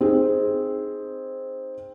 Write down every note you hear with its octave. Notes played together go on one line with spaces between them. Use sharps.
C4 D#4 G#4